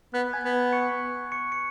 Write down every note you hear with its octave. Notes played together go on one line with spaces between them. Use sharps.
B3 F#6
G#5 G#6
B3
C#6 C#7
C#6 C#7
C#7